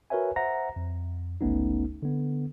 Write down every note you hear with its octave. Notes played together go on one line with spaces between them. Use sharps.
F#4 A#4 B4 C#5 E5 G#5
C5 E5 F#5 A#5 A#6
F2
G1 C#2 A3 B3 C#4 D#4
D3 B3